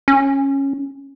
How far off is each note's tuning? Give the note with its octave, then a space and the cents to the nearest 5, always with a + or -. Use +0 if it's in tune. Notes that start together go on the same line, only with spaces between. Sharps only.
C#4 -10